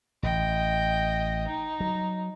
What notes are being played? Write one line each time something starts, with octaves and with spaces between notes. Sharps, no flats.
A1 D#5 G5
D#4
F#3